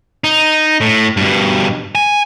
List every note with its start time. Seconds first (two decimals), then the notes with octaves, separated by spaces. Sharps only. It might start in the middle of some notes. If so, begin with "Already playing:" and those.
0.24 D#4
0.81 A2
1.17 G2 B2
1.95 G#5